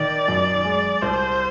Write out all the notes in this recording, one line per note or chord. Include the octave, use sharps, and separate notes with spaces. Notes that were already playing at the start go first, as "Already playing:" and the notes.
Already playing: D#3 D5
F#2
G#3
C2 C5